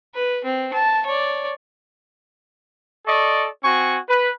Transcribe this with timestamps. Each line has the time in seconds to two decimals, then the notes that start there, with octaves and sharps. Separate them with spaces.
0.15 B4
0.45 C4
0.73 A5
1.06 C#5 D5
3.06 A4 D5 D#5 C#6
3.64 C4 F#4 G#5 C#6
4.08 B4